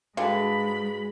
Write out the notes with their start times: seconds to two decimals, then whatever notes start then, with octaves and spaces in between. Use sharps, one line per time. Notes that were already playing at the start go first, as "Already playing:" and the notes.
0.17 G#2 D3 E3 G3 F#4 G#4 F5 B5